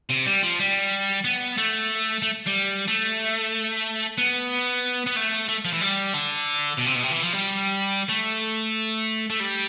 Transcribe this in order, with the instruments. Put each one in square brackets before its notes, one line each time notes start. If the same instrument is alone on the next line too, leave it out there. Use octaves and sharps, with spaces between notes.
[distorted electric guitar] C3
G3
F3
G3
B3
A3
A3
G3
A3
B3
B3
A3
A3
F3
E3
G3
D3
B2
C3
B2
C3
E3
F3
G3
A3
A3
G3